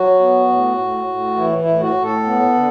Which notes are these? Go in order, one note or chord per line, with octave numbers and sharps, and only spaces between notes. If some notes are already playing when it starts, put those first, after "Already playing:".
Already playing: F#3 F#4
B3
A2
A2
A2
E3 E4
E4
A2
F#4
A2
A4
B3
D3